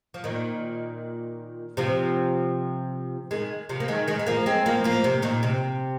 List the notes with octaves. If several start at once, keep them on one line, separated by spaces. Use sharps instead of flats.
F3
A#2 D#3
C3 F3
D#3 G#3
C3 F3
A#3
D#3 G#3
D#3 G#3
G#3
F3 A#3
G#3 C4
F3 A#3
F3 A#3
C3
A#2 D#3
C3